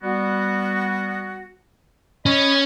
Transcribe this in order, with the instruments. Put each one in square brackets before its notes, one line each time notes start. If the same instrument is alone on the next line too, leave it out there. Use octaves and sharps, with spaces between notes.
[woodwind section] G3 B3 F#4
[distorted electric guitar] C#4 [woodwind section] D#5 B5